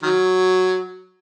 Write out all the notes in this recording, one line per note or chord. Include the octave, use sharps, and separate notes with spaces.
D#3 F#3